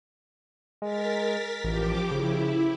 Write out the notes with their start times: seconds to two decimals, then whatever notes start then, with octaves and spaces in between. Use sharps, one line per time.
0.82 G#3 A#4 A6 B6
1.64 A1 F3 G4 D6
2.11 C#3 E4